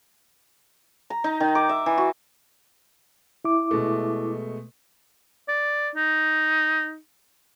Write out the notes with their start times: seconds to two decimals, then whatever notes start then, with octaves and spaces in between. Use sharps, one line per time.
1.10 A#5
1.24 D#4
1.40 D#3
1.55 D6
1.69 E5
1.86 E3
1.98 F#4
3.45 E4 D6
3.71 B2 G#3 A3
5.48 D5
5.95 D#4